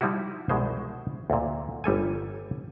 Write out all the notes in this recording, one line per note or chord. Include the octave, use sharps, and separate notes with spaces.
F3 G3 D#4 E4 F#4
C2 B2 G#3 C5
D2 A#2
G1 G3 A4 G#5